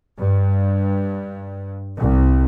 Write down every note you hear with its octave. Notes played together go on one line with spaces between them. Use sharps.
G2
C2